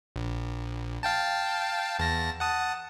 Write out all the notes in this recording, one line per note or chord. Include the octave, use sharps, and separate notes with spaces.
A#1
F5 G5 A5
E2 A5 A#6
F#5 A5 D#6